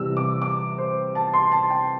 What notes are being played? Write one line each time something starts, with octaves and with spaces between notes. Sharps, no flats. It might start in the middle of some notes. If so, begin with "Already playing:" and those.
Already playing: C3 E3 G3 E6
D6
D6
C5
A5
C6
A5
G5